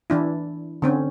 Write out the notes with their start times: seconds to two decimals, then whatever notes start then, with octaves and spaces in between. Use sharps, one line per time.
0.10 E3 D4 E4
0.82 D3 C4 C#4